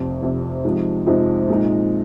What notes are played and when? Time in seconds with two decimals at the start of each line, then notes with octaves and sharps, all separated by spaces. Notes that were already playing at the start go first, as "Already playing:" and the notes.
Already playing: F1 F2 C3
0.22 F1 F2 C3
0.65 F2 C3 F3 G#3 D#4
1.06 F2 C3 F3 G#3 D#4
1.48 A#2 G#3 D#4